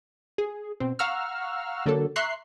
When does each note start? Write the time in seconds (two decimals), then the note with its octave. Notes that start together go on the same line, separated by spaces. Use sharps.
0.38 G#4
0.80 B2 C4
0.99 F5 F#5 A#5 C#6 E6 F6
1.86 D3 F#3 A#3 D4 A4
2.16 E5 A#5 C6 C#6 F#6 C7